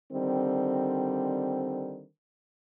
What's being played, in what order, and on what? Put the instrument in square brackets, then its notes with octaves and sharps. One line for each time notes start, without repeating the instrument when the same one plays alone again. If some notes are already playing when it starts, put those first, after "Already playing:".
[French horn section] D3 D#3 G3 C4